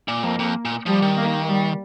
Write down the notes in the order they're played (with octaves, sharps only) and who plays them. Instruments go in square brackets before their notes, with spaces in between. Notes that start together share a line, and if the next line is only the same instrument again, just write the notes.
[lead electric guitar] A#2
[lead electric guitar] F2 [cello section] A#3
[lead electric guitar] F2
A#2
[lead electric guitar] F3 [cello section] G3
[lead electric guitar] D#3
[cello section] A#3
G3